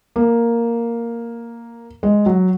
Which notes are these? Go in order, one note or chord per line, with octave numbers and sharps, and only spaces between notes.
A#3
G#3
F#3